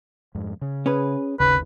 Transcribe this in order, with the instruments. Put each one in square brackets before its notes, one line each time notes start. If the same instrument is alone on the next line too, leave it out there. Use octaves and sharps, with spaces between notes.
[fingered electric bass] F2 G#2
C#3
[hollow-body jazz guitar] C#4 G#4 B4
[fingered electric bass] G#1 D#2 [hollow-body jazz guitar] C#3 [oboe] B4